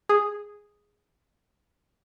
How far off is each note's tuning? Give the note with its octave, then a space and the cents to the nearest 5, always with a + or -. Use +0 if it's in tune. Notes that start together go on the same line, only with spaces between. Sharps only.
G#4 -5